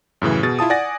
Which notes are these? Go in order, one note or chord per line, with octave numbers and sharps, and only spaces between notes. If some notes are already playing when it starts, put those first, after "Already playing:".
F#2 A2 C#3 E3
B2 G#4 A6
E4 F4 A5 D#6
D5 F#5 G#5 A6 A#6